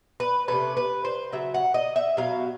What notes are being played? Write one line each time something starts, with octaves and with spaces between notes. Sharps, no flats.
B4
C3 F3 A3 C#4 B4
B4
C5
C#3 F#3 E5
F#5
D#5
E5
B2 F#3 F5